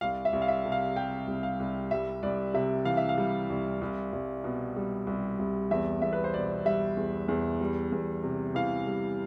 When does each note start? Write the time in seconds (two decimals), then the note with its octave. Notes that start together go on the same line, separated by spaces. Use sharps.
0.01 C2 F5
0.25 E5
0.33 C2
0.42 F5
0.48 E5
0.65 C3
0.72 F5
0.96 G3 G5
1.28 C2
1.43 F5
1.60 C2
1.91 G3 E5
2.23 C2 D5
2.54 C3 E5
2.85 E3 F5
2.97 E5
3.09 F5
3.18 G3
3.50 C2
3.81 C2
4.13 C2
4.44 B2
4.76 G3
5.07 C2
5.39 C2
5.71 E2 E5
6.02 E2 E5
6.13 B4
6.24 C5
6.33 B2 D5
6.65 G3 E5
6.97 E2
7.28 E2
7.61 G3
7.92 E2
8.23 C3
8.55 E3 F5
8.86 G3